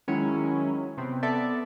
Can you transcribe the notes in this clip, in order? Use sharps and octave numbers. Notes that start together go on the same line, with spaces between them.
D#3 F#3 G#3 C#4 E4
C3 B3 C4
B3 A4 D5 E5 A5